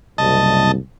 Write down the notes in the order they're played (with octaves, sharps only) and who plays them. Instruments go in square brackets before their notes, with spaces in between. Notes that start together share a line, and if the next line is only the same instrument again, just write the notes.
[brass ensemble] F#1 C2 [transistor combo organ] D#5 A5